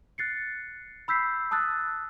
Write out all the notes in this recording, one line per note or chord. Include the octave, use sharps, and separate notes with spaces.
F#6 A6 C7 C#7
B5 E6 G6 B6 C7
A5 D#6 E6 F#6 A6